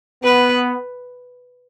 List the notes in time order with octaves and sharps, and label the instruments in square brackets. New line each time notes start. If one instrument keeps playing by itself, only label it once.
[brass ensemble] B3 [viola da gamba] B4